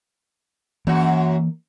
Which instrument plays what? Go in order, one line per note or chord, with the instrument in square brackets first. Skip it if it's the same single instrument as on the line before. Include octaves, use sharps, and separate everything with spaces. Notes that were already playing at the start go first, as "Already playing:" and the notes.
[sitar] F#2 F#4 [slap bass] E3 A#3